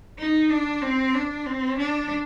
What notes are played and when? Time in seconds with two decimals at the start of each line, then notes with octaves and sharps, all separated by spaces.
0.18 D#4
0.50 D4
0.82 C4
1.14 D4
1.46 C4
1.78 D4